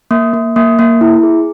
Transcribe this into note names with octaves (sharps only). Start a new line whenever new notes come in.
A#3
A#3
A#3
A#3
E4
G#4